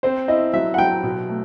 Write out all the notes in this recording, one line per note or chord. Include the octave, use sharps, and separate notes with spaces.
C4 C5
E4 D#5
F#3 E5
F#5
F#3 G5
B2
A3